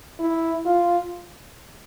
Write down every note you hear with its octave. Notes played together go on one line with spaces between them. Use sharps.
E4
F4